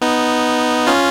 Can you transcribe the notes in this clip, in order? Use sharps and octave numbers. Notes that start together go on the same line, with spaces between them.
B3 D#4
C#4 F4